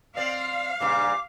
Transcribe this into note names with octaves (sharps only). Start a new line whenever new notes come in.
C4 D5 F5
G2 A#2 C#3 D6